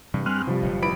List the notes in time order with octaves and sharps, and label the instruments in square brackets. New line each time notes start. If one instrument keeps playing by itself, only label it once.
[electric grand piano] G2 [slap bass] C3 E3 G3
[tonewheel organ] G3 F6 F#6 [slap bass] C4 [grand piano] G#5 C6 D#7
[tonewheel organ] C3 [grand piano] F3 G3 F4
[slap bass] F#1 B2
[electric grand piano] G#1 B5 D7 [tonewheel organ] E4 B4